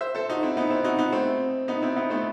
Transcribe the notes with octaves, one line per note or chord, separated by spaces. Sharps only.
C5 E5
A4 C5
D#4 F#4
C4 E4
B3 D#4
C4 E4
D#4 F#4
B3 D#4
A3 C4
B3 D#4
C4 E4
B3 D#4
A3 C4